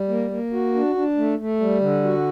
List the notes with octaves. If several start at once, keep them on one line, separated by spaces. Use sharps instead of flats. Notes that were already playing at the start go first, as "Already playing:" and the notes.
Already playing: G3
A#3
A#3
F#4
D4
D4
A3
A3
G3
D3
F#4